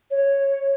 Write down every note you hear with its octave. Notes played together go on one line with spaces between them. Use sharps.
C#5